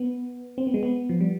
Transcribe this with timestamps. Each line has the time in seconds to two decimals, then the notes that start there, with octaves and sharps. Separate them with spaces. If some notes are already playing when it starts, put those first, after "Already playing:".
Already playing: B3
0.58 C4
0.67 B3
0.74 G#3
0.83 B3
1.09 F3
1.21 G3